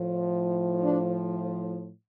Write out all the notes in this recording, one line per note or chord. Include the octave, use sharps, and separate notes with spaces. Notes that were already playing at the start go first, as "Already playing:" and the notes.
Already playing: A2 F3
D4